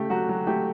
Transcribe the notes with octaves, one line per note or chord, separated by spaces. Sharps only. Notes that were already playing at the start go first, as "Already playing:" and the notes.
Already playing: C#3 A3 G4
F#3 F#4
F#3
A3 G4